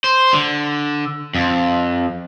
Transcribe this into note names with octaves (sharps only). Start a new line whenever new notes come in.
C5
D3
F2